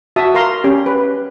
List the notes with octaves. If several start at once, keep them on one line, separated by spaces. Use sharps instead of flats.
F#4 E5 A5 D#6
A#4 F5 A#5 C6
C#4 G4
B4